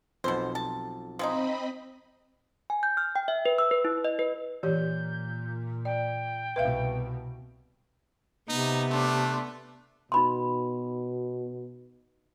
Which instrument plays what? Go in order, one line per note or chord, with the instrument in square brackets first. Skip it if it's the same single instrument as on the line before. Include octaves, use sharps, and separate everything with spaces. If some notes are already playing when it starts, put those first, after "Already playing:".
[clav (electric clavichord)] B1 F2 [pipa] B2 C5
[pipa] A5
[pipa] F3 G#3 D#4 [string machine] C4 D#5 B5
[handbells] G#5
G6
F6
G5
E5
B4
E6
B4
E4
D#5
B4
[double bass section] A#2 [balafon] E3 G4 C#5 [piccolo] G6
[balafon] D5 [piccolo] G5
[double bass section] C2 B2 [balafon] B4 E5 F5
[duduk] C3 [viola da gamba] B3 [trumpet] D#4
[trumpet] A3 [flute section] D4 C6 D6
[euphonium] B2 [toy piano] D#4 B5 C6